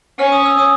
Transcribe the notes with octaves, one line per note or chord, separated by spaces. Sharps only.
C#4 F6
D#6
E6
D#6